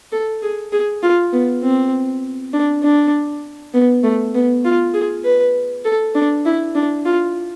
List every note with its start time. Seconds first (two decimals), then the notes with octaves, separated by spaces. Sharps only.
0.12 A4
0.42 G#4
0.72 G#4
1.03 F4
1.33 B3
1.63 C4
2.53 D4
2.83 D4
3.74 B3
4.03 A3
4.35 B3
4.64 F4
4.94 G#4
5.24 B4
5.85 A4
6.15 D4
6.45 E4
6.75 D4
7.05 F4